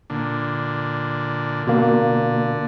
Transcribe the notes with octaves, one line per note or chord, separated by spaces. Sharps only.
A#2 D3
B2 D3 A#3